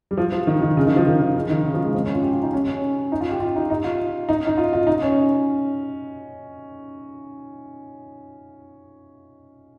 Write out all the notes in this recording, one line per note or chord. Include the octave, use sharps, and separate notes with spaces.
G3
F3
F3
D#3
D#3
C#3
D#3
F3
D#3
D#3
C#3
D#3
C#3
F3
G#3
C4
C#4
F4
G4
F4
D#4
C#4
C#4
D#4
F4
G4
F4
D#4
D#4
F4
D#4
D#4
F4
F4
D#4
C#4